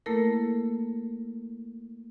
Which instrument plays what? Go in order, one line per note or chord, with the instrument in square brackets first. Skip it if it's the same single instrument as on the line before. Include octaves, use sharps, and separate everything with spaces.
[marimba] A3 A#3 E4 A4 A#4